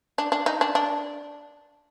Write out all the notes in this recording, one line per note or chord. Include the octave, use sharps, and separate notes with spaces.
D4
D4
D#4
D4
D4